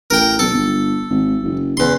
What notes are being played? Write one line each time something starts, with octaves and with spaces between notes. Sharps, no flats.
A1 A#4 G5
B1 A4
G1
G#1
F#1
E2 C#3 C6